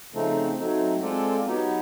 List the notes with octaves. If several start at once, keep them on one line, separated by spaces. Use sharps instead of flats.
C#3 F3 A3 C4 D#4
F#3 A3 C4 D#4
G#3 C4 F4 A4 D5
F#3 B3 D#4 G4